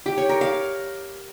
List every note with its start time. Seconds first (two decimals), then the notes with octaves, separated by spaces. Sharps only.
0.06 G4
0.18 C#5
0.29 A#4
0.41 F5